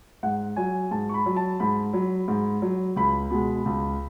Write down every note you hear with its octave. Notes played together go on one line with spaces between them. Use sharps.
G#2 F#5
F#3 G#5
G#2 A5
C#6
B5
F#3
A5
G#2 B5
F#3
G#2
F#3
C#2 B5
B2 G#3
C#2